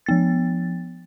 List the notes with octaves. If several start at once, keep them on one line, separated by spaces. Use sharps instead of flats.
F3 B3 A6